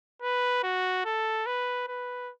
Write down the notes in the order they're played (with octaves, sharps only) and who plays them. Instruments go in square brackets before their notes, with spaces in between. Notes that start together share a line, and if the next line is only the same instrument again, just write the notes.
[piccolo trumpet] B4
F#4
A4
B4
B4